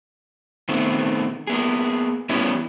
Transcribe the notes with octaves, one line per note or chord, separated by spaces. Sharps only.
D#3 A3 B3 C4
A#3 B3 G#4
E3 G3 B3 C#4 E4